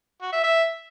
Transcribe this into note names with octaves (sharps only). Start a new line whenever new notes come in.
F#4
E5
E5